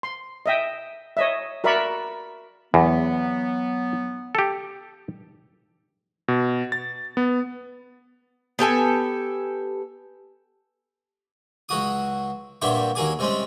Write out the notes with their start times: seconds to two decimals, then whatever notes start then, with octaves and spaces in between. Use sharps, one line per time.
0.03 C6
0.46 D#5 E5 G5
1.17 C#5 D#5 E5
1.64 F#4 A#4 D5 E5 B5 C#6
2.74 E2 F#3 B3
4.35 G4 A4
6.28 B2
6.72 A6
7.17 B3
8.59 B3 G4 A4 G#5
11.69 C#2 F#3 F#4 D#6
12.62 G2 A#2 F#3 E5 G5 D6
12.95 D#2 F#3 A#3 G#4 G#5 D6
13.19 C3 G3 G#3 C4 C#4